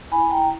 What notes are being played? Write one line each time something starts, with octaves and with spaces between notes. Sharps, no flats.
E4 G#5 B5
G5 A#5
E4